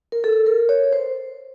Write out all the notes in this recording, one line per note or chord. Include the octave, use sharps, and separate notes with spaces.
A#4
A4
A#4
C#5
C5